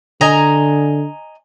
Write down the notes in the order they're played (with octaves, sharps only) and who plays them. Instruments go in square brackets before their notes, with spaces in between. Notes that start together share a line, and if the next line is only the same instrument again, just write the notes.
[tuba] D3 [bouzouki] D#5 G#5 A#5